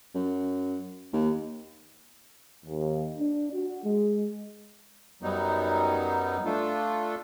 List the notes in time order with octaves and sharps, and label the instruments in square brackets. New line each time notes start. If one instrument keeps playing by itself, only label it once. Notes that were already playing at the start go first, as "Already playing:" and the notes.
[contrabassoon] F#2
D#2
[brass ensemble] D#2
D4
F#4
G#3
[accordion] F#2 F#3 G3 B3 D#4
A3 D4 F4 A4